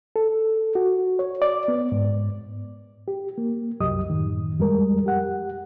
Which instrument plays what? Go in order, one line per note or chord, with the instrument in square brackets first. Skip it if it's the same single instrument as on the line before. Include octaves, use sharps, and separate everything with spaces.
[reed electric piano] A4
F#4
C#5
D5
B3
G#2
G4
A#3
C2 F#2 F#3 G4 D#5 D#6
F#2 A2 D#3
F2 G3 G#3 A#4
G4 F#5